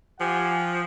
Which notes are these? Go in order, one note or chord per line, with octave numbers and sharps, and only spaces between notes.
F3 G4 F#5 G#5